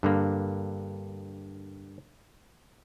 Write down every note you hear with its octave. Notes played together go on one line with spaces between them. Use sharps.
G2 D3 A#3